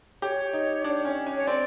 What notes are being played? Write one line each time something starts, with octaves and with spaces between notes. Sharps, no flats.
G4 C#5
D#4
D4
C#4
C#4
C#5
C4 D5